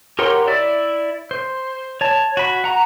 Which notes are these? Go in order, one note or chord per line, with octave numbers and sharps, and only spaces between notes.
G4 A#4 C#5 F#5 C6
E4 D5 E5
C5
C#5 A5
F#4 B5
F#5 A#5